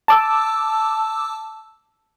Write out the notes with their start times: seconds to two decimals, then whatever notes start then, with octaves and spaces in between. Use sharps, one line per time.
0.08 A5 D6 E6